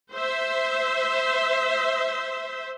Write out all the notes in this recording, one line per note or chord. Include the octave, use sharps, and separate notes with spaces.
C5 E5